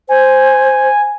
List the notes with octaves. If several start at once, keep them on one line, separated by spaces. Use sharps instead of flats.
C5 G#5